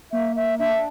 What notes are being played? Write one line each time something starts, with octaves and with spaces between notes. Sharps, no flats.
A#3 E5
E5
D4 E5